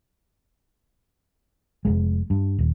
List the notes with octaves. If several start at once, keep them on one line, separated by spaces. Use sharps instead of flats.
F1 E2 G#3
G2
D#1